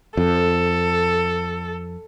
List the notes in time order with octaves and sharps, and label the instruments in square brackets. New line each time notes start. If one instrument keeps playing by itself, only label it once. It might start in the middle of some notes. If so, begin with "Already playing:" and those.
[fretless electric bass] F2 [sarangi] A4